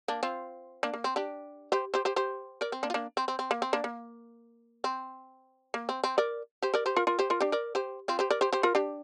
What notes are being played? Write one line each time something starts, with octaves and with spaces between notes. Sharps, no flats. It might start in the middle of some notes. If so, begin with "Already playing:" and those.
A#3 D4
C4 F4
A#3 D4
A#3
C4
D4 G4
G4 C5
G4 C5
G4 C5
G4 C5
A#4 D5
C4
A#3 D4
F4
A#3 D4
C4
C4
C4
A#3
C4
A#3 D4
A#3
C4
A#3
C4
C4
A#4 D5
G4 C5
A#4 D5
G4 C5
F4 A#4
F4 A#4
G4 C5
F4 A#4
D4 G4
A#4 D5
G4 C5
C4 F4
G4 C5
A#4 D5
G4 C5
G4 C5
F4 A#4
D4 G4